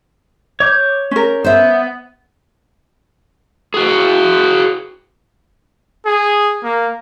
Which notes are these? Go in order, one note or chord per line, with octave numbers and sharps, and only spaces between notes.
C#5 D6 G6
C#4 A#4
B3 C5 E5
F#4 G#4
G#4
A#3